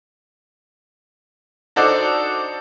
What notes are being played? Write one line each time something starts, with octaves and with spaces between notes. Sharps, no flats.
D4 D#4 F#4 A4 C5 D5